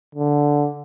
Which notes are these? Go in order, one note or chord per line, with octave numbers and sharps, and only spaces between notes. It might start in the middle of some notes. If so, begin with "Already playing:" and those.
D3